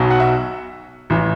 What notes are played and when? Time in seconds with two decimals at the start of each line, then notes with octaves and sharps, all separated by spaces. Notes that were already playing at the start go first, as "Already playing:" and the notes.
Already playing: B1 B2 F#3
0.11 F#5
0.20 E5
1.10 A1 E3